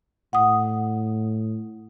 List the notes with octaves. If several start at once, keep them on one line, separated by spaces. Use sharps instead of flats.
A2 F#5 D#6